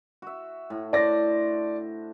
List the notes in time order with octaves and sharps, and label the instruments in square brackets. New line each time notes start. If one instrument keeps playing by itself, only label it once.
[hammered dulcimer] F#4 E5
A2
[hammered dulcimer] D4 C5 [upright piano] D5 A#6